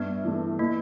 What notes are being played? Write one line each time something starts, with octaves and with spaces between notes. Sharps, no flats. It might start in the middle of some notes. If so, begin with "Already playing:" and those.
Already playing: G2 B3
E3 A3
E3 A#3